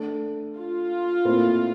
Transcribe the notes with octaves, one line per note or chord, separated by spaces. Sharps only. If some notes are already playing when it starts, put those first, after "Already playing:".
Already playing: A3 D4 A4
F4
A#2 A3 C4 E4 A#4